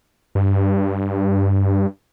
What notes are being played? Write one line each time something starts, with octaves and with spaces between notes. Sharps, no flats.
G2